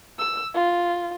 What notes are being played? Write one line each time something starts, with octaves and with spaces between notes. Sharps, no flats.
E6
F4